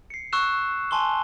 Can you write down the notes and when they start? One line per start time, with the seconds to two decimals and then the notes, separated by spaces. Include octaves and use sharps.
0.10 C7 C#7
0.33 C#6 E6 F#6 E7
0.91 G#5 A5 C6 C#6 G7